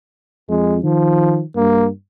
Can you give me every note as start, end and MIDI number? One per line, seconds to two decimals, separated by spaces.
0.49 0.79 41
0.49 0.78 56
0.83 1.43 51
0.83 1.42 53
1.56 1.89 43
1.56 1.87 58